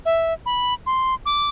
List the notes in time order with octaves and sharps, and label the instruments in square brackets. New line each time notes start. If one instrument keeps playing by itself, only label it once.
[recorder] E5
B5
C6
D6